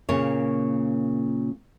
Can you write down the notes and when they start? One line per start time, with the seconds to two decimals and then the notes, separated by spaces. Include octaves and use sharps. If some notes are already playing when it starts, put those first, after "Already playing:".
0.09 A#2 C#3 A#3 C#5